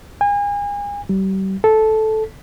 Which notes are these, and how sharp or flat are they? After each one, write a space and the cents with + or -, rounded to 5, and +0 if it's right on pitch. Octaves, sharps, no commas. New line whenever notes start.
G#5 -35
G3 -35
A4 -10